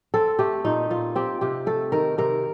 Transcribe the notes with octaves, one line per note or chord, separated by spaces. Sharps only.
C4 A4
A3 G4
A#2 D#4
A#2 F4
C4 G4
C3 G4
A3 A4
D#3 A#4
C3 A#4